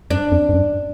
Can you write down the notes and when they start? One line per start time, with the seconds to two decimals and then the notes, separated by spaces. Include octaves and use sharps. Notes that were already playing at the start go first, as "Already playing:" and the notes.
0.11 F#2 D4
0.32 F2
0.49 G2
0.54 F#2